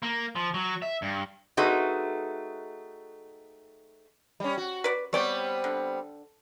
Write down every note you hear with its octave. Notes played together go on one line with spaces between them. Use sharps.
A#3
F3
F#3
E5
G2
A3 C4 D#4 F#4 G#4 B4
G3 C#4
F#4
B4 D5
G3 B3 C4 C#5 D5 G5
D3